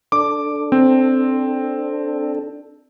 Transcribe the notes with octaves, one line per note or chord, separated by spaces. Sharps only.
D4 A4 D6
C4